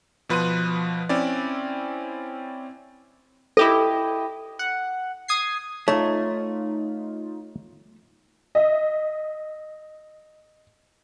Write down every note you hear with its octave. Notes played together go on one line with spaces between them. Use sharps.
B2 F3 B4 C6 F#6 D#7
C4 C#4 E4 D5
E4 G4 A4 D#5
F#5
D#6 G#6 C7
A3 D#4 F4 C#5
D#5 E5